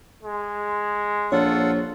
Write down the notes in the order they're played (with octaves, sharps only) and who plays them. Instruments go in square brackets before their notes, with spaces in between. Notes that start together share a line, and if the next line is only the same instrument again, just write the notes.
[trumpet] G#3
[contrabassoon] A#1 [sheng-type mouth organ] F4 A4 F#5 [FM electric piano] C#5